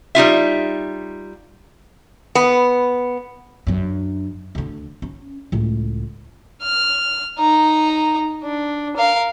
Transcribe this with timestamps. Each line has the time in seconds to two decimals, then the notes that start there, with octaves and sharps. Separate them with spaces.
0.15 G3 D#4 F4 E5
2.35 B3
3.67 F#2 D4
4.55 D2 D3
5.02 C#4
5.52 C#2 A2
6.62 F6
7.38 D#4 A#5
8.44 D4
8.97 A#4 F5